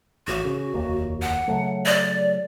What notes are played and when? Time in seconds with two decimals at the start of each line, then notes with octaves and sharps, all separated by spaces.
0.28 A1 F#4
0.45 C#3
0.74 F1 D#2 A#3
1.22 F#5
1.48 C#3 F#3 A3
1.86 D5